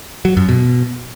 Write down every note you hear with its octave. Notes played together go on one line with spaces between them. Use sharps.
F#3
F#2
B2